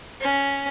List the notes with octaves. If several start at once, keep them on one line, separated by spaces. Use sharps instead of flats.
C#4